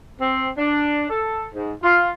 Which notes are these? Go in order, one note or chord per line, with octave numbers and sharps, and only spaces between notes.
C4
D4
A4
G#2
F4